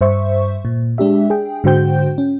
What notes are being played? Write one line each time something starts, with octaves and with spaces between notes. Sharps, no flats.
G2 C5 E5 C#6
A#2
G#3 D4 G4 E5
G#4 G5
G#2 D3 F#4 C5 G5 G6
C#4